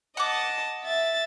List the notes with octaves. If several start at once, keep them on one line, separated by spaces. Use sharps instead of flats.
D#5 F#5 A5 D6
E5 A6